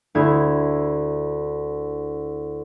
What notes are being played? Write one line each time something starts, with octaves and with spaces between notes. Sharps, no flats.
D2 E4 G#6